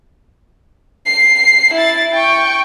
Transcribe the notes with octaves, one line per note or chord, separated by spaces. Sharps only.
C7
E4 A6
G5 C#6